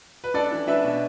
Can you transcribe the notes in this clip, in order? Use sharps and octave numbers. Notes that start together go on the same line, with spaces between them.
B4
D4 A4 D5
E3
D4 B4 E5
B2